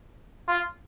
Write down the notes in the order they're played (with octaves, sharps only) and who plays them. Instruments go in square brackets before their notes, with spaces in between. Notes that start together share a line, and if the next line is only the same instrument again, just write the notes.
[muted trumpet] F4